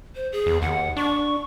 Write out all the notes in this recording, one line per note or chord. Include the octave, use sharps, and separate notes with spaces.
C5
G#4
E2
D#2 F#5
D4 C#6